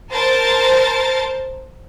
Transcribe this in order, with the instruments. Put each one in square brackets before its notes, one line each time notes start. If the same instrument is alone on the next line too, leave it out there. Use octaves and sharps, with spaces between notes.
[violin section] A#4 C5 A5 A6